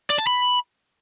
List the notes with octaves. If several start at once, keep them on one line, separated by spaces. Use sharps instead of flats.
D5
A5
B5